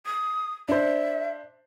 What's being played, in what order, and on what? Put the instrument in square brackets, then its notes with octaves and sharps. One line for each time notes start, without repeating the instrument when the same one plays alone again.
[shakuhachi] D#6
[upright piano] D4 C5 [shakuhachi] E5